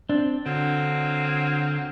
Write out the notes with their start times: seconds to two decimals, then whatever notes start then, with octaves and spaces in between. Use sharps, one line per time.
0.09 C4 D4
0.46 D3 F#3 A#3 C4